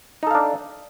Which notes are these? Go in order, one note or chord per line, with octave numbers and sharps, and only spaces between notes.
D4 D#4 A4 F5